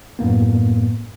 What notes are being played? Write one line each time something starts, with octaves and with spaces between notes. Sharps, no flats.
F#2 A2 A#3 B3